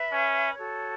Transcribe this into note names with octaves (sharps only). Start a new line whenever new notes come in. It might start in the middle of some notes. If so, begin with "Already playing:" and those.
Already playing: B4 E5 B5
C#4
F#4 A4 C#5